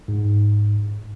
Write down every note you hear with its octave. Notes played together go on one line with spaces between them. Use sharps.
G#2